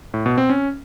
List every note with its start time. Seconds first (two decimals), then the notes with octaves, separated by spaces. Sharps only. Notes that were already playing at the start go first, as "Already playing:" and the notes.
0.14 A2
0.26 B2
0.38 C4
0.50 C#4